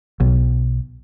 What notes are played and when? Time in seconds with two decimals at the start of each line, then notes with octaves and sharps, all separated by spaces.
0.20 B1